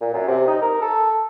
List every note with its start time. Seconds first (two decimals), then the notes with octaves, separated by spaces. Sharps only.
0.02 A#2
0.14 F#2
0.28 C3
0.48 D#4
0.62 A#4
0.82 A4